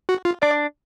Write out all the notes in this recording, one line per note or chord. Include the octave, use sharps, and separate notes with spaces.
F#4
F4
D4 D5